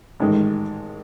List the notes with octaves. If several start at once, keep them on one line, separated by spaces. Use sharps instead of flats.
A1 G#2 D#3 G#3